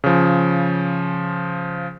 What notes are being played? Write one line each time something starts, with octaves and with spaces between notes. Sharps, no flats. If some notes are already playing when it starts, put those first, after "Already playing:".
C#3 F3